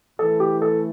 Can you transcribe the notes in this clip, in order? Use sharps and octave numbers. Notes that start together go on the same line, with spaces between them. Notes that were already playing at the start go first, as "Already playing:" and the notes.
A2 E3 A3 A4
G4
A4